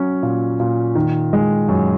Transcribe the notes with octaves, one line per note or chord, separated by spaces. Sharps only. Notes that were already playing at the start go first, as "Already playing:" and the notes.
Already playing: F#3 C#4
A#2
A#2
D#3
G#3
F#2